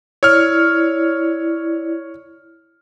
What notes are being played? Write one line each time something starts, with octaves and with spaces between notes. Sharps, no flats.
E4 C#5 D5 F6